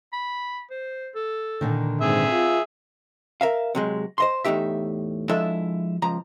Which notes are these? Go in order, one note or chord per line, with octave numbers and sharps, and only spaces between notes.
B5
C5
A4
A#2 D3 D#3
G#2 C4 G#4 E5
F4
A#4 E5 F5
C3 F#3 G#3
C5 D#5 C6
E2 A2 D#4 G4 E5
F3 G#3 D4 E4 A4 E5
C#2 F3 A#5